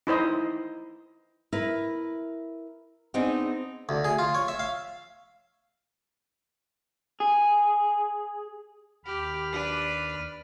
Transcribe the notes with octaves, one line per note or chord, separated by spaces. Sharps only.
D#4 E4 C5 D#5
E4 A#4 B4
B3 C4 D4 D#4 G#4
D2
G#4
F4
C#5
E5
F5
G#4
D#2 G4 B5 F6
D4 B4